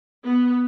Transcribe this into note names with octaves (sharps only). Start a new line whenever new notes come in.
B3